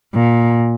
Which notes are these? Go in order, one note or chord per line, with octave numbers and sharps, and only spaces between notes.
A#2